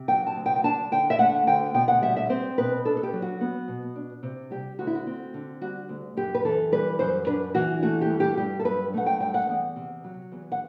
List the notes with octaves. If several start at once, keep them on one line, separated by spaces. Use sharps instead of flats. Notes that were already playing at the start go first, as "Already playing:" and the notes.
Already playing: C3
F#3 G5
A5
D2
G5
G5
D4 A5
D3 G5
E5
A3 F#5
D2 G5
B2 G5
F#5
G3 E5
E5
C4 C5
B2 B4
D4 A4
A4
G4
F#3
F#4
B3
B2
D4
C3
G3 G4
D2 F#4
E4
F#4
C4
D3
G3 F#4
D2
F#2 G4
B4
E3 A4
G3 B4
F#2 C5
D4 B4
E3 F#4
A3 F#4
G4
G2
G4
G2 G4
A4
F#3 B4
A3 F#5
G5
G2 G5
F#5
E2
C3
F#3
E2
F#5